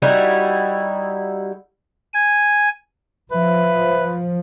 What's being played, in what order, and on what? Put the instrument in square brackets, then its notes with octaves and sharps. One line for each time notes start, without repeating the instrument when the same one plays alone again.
[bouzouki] G3 D#4 E4 F#4
[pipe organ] G#5
[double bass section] F3 [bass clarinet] B4 [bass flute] E5